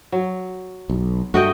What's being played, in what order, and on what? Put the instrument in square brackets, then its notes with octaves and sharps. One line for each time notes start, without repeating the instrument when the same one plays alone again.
[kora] F#3
[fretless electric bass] B1
[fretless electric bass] G2 A3 [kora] F#4 D#5 G5